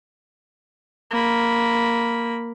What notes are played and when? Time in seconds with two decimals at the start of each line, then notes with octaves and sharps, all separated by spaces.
1.11 A#3 B5